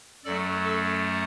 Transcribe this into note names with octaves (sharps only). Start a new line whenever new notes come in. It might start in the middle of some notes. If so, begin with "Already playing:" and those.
F#2 F#3 A3 A4 D5
A4